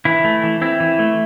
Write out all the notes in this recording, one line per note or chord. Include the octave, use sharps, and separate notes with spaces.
E3 E4
A3
E3
C4 E4
E3
A3